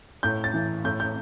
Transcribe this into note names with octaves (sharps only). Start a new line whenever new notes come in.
A2 G6
A6
E3
A2 G6
G6